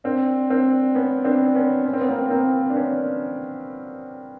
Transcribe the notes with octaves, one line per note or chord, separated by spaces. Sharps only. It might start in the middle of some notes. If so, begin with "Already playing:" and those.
C4 D4
C4 D4
B3 C#4
C4 D4
B3 C#4
C#4
C4
B3
A#3 C4
A#3 C4
D4
B3 C#4